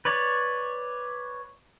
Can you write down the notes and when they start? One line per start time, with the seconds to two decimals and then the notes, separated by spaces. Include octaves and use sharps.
0.05 B4 C#5 D5